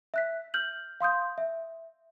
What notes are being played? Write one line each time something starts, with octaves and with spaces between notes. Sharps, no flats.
E5 F#6 B6
F6 G6 F#7
F5 C6 D#6 G6
E5